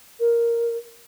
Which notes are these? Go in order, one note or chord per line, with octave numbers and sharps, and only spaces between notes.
A#4